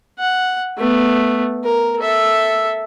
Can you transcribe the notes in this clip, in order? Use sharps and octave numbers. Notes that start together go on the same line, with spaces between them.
F#5
A3 B3
A#4
A4 E5